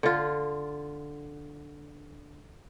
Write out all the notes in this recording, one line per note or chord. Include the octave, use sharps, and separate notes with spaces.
D3 F4